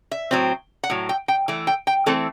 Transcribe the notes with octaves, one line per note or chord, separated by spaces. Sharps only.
E5
A2 F#3 C4
F#5
A2 F#3
G5
G5
E3 A3
G5
G5
E3 A3 C4 A4